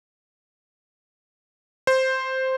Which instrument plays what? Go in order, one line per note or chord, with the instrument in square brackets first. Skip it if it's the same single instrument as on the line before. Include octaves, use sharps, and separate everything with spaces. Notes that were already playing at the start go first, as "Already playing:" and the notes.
[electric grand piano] C5